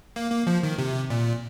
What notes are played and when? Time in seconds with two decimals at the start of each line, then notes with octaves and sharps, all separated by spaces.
0.16 A#3
0.31 A#3
0.47 F3
0.63 D#3
0.78 C3
1.10 A#2